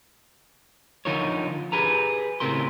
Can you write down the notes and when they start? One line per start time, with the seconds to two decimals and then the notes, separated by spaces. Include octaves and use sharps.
1.05 D3 F3 D#4 F4 A#4 C#5
1.72 G4 G#4 B4 A#5
2.40 A2 C#3 C4 G4 A#4 C6